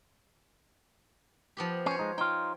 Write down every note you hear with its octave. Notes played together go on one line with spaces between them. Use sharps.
F3 B3 G4
C#4 C5 C#5
G#3 D#4
D#4 F4 G5